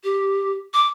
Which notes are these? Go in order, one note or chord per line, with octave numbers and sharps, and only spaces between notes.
G4
D6